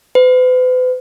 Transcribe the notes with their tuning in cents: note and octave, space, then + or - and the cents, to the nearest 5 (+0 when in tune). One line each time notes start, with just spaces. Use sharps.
B4 +45